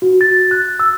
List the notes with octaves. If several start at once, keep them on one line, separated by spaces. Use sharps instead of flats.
F#4
A6
F#6
E6